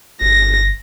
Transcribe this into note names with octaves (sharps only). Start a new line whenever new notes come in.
G1 A#6